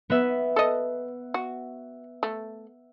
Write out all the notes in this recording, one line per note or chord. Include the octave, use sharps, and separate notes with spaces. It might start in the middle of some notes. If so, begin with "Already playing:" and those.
B3 B4 E5
A4 D#5
F#4
A3